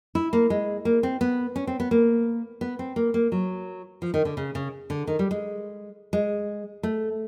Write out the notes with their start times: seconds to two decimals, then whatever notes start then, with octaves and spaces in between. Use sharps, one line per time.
0.15 E4
0.33 A#3
0.50 G#3
0.85 A#3
1.03 C4
1.21 B3
1.56 C#4
1.67 C4
1.80 B3
1.91 A#3
2.61 B3
2.79 C4
2.96 A#3
3.14 A#3
3.32 F#3
4.02 F3
4.14 D#3
4.25 D3
4.37 C#3
4.55 C#3
4.90 D3
5.07 D#3
5.19 G3
5.31 G#3
6.13 G#3
6.83 A3